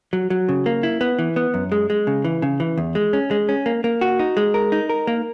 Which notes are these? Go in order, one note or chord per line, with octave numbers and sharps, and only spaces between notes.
F#3
F#3
C#3
A#3
E4
B3
E3
B3
F#2
G#3
G#3
C#3
E3
C#3
E3
E2
G#3
C#4
G#3
C#4
A#3
A#3
F#4
D#4
G#3
A#4
D#4
A#4
A#3